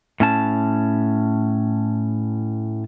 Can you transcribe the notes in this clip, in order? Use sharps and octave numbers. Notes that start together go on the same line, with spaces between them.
A2 C#4 A5